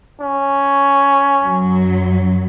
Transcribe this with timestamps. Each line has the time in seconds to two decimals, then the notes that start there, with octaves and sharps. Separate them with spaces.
0.21 C#4
1.44 F#2 F#3